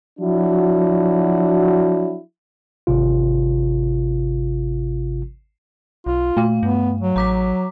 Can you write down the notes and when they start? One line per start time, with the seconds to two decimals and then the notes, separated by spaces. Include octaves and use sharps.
0.20 F3 F#3 D4 E4 F#4
2.87 G#1 C3 F4
6.06 B1 F4
6.37 A#2 A3 F5
6.63 G2 B3
7.01 F#3
7.16 A1 A#5 D6 B6